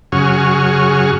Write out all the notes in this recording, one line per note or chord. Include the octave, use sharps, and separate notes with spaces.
F#2 C#3 F#4 G#4 C#6 F6